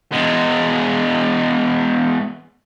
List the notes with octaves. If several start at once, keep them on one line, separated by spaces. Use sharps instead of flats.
E2 G#3